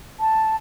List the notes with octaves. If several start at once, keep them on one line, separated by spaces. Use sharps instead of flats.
A5